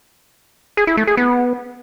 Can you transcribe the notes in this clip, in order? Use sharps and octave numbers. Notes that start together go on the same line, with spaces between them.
G#4
E4
A3
G#4
B3